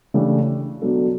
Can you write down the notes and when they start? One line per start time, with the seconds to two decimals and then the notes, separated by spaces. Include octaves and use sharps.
0.14 C#3 E3 A3 D4 G4
0.82 B2 F#3 B3 D4 A4